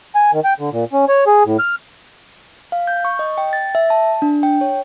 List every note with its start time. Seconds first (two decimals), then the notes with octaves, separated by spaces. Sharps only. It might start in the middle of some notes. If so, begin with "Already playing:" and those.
0.15 G#5
0.33 D#3
0.44 G5
0.59 D3
0.72 A#2
0.93 C#4
1.08 C#5
1.27 G#4
1.45 A2
1.59 F6
2.72 F5
2.87 G6
3.05 C#6
3.19 D#5
3.38 G5
3.53 A6
3.75 E5
3.90 A5
4.22 D4
4.43 G5
4.61 C#5